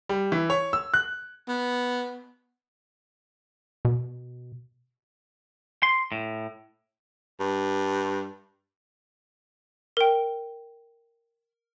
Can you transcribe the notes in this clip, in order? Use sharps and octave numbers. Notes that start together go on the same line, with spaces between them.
G3
E3
C#5
E6
F#6
B3
B2
C6
A2
G2
A#4 G5